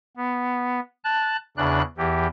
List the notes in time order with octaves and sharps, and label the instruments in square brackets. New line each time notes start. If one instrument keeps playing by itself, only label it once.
[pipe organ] B3
A5 F#6
E2 C#3 D4 F#6
E2 E3 G4